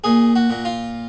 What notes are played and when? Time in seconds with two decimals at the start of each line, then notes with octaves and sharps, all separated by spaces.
0.04 A#2 G#4
0.36 F#4
0.50 A#2
0.65 F4